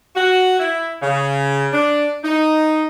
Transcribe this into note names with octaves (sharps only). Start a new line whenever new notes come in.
F#4
E4
C#3
D4
D#4